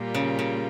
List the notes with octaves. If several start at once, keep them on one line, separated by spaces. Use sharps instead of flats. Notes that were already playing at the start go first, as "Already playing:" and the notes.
Already playing: A#2 G3 A#3 F4
C#3
C#3